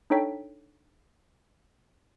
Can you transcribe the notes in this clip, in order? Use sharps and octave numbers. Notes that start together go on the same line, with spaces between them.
D4 D#4 A4 C#5 G5 B6